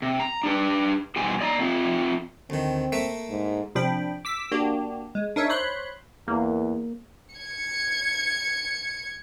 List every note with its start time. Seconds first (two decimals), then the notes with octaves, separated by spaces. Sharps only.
0.02 C3
0.20 A#5
0.44 D4 G4 B4
1.16 B2 E3 G3 C5 G#5
1.41 D5 D#5 A#5
1.59 A3 C4 F4
2.50 D2 D#3 C4
2.92 A3 A#3 E5
3.29 G#2
3.75 C3 F3 D4 G5 B5
4.25 D6 E6 B6
4.52 A#3 D4 F#4 G4
5.15 G#3
5.36 D4 D#4 A#4 C#5 E5
5.49 C5 C#5 B5 C6 F#6
6.28 E2 A#3
7.33 G#6 C#7